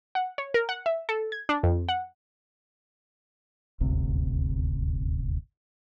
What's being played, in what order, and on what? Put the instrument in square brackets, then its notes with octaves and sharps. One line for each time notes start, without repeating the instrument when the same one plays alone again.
[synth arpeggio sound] F#5
C#5
A#4
F#5
E5
A4
G#6
D4
F2
F#5
[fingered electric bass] D#1 G#1 D2 C3